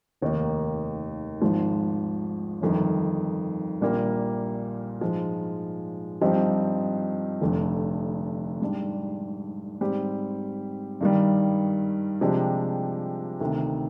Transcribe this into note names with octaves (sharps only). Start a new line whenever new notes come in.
F1 D#2 D#3 A#3 D#4
G#1 G#2 F3
G1 F2 D#3
A#1 A#2 G3 A#3
G#2 F3 G#3
G2 F3 C4 D#4 G4
F1 F2 D3
G#2 G3 D4
G#2 G3 C4 G4
G2 D#3 G3
C3 F3 G#3 D4 G4
D2 C3 D#3